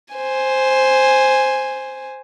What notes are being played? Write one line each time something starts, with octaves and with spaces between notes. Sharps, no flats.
C5 G#5